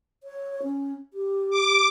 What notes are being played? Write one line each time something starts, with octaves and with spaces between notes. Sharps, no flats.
C#5
C#4
G4
D6